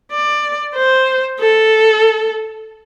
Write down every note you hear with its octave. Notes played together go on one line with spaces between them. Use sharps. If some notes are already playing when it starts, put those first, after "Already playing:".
D5
C5
A4